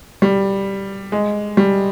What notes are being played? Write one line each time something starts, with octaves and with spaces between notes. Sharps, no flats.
G3
G#3
G3